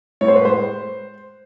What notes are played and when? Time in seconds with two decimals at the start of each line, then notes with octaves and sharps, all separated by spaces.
0.21 A2 C#5
0.28 C5
0.36 B4
0.43 G#3 C5